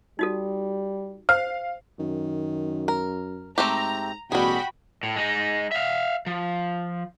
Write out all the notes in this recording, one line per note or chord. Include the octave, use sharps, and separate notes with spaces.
G3 D#4 F#4 A4
C5 F5 F6
F#2 D#3
A#4
G#2 A3 C4 G4 A#5
A1 B2 G3 F#4 G#4 G5 B5
A2
G#3 D#4
E5 F5
F3